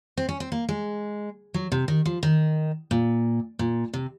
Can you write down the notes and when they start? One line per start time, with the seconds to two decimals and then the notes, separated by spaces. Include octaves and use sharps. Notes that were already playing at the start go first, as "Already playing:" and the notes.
0.17 C4
0.29 C#4
0.40 C4
0.52 A#3
0.69 G#3
1.54 F#3
1.72 C3
1.88 D#3
2.05 F3
2.23 D#3
2.91 A#2
3.59 A#2
3.93 C3